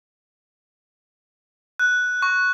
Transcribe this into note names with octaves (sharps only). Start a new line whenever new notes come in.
F#6
C#6